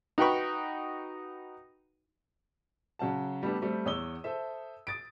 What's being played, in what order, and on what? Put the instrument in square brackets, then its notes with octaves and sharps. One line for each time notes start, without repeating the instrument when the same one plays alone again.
[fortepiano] D#4 F#4 B4 G5 B5 C#6
[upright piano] C#3 F#3 F#5 A5
G3 A3 B3 D4 G4
G3 A3 C4
E2 C#5 D#6 E6 G7
A4 C5 E5
D#6 A6 D7